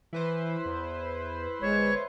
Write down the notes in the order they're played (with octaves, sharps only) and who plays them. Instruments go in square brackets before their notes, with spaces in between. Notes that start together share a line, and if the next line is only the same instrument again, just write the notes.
[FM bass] E3 [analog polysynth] E4 B4 C5
[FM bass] E2
[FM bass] G1 [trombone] G#3 [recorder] C#5